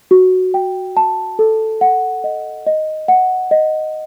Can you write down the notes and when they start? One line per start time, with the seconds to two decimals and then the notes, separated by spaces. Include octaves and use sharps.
0.11 F#4
0.54 G5
0.97 A5
1.39 A4
1.81 F#5
2.24 D#5
2.66 D#5
3.08 F#5
3.51 D#5